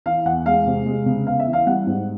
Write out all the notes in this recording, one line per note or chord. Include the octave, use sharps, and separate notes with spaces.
E3 F5
E2 F#5
G#3 F5
C3
G#3
C#3
B3 F5
E5
E3
F5
G3 F#5
G#2